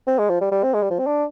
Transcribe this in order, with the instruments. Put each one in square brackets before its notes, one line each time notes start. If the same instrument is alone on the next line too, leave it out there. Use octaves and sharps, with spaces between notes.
[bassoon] C4
G#3
F3
G3
G3
C4
G#3
G3
F3
C4
D4